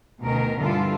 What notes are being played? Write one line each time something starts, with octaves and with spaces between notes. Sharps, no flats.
D2 B2 D#3 C#4 A#4
G2 D3 E3 G3 F4 A4